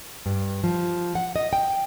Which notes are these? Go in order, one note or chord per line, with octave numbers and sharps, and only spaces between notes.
G2
F3
F#5
D#5
G5